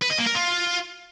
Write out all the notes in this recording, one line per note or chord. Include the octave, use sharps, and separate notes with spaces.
B4
D#5
A#3
A#4
F4